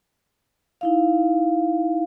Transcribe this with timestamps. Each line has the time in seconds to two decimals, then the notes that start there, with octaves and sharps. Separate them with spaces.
0.81 D#4 E4 F5